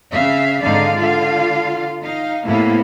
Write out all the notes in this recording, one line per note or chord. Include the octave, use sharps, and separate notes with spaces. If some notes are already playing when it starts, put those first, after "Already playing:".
C#3 E5 F5
G#2 D3 D#4 D5 F5
D3 F4 F5
D#4 F5
A2 C3 A#3 B3 E4 F5